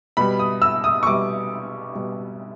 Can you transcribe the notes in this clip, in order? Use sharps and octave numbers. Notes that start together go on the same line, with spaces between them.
B2 G3 B5
D#6
E6
D#6
C#6
B2 G3 D6
B2 G3